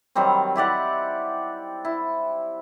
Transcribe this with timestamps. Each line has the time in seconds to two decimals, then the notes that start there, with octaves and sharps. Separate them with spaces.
0.15 D#3 F#3 G3 C4
0.56 E4 G4 D5 F#5
1.85 E4